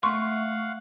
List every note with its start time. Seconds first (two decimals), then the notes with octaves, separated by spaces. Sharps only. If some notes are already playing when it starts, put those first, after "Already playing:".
0.03 A3 F5 F#5 C6 C#6